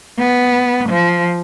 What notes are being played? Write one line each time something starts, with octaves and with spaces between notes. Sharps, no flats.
B3
F3